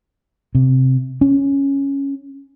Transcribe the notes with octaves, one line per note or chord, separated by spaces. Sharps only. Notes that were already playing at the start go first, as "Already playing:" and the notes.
C3
C#4